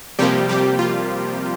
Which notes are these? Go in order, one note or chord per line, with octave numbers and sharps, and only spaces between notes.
C3 F3 G3 A#3 G4
G3 G4
F4